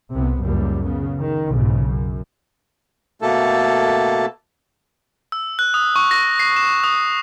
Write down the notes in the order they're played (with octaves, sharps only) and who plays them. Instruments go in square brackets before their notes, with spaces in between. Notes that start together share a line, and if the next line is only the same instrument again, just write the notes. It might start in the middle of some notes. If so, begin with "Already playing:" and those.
[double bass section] C2 C3 B3
C#2 F#2 G3 A#3
C#3 B3
D#3
B1 G#2 C#3
F#2
[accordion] B2 A3 A#3 A4
[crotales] E6
F#6
D#6
C#6
A#6
C7
E7
D#6